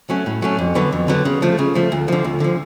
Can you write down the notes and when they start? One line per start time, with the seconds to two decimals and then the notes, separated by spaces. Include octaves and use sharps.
0.10 F#3 A3 C#4
0.26 A2
0.42 F#3 A3 C#4
0.59 F2
0.75 D3 F#3 B3
0.92 F2
1.08 D3 F#3 B3
1.25 C#3
1.42 F3 A3
1.59 C#3
1.75 F3 A3
1.92 D2
2.08 D3 F3
2.24 D2
2.40 D3 F3